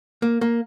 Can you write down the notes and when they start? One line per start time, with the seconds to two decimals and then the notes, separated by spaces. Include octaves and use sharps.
0.22 A#3
0.41 A#3